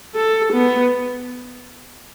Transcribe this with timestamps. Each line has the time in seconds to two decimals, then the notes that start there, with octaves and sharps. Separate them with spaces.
0.15 A4
0.53 B3